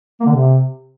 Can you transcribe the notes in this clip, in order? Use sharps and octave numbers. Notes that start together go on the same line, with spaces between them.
A#3
D3
C3